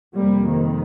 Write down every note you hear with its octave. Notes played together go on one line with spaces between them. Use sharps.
F2 C3 G3 A#3
D#3